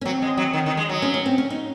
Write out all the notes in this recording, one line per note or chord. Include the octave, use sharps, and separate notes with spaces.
C#4
F#3 C4
G#3
F#3
D#3
D#3
G#3
F#3
C#4
C#4
C4
C#4
D#4